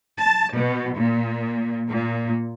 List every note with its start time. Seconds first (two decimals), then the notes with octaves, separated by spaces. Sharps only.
0.19 A5
0.54 B2
0.98 A#2
1.88 A#2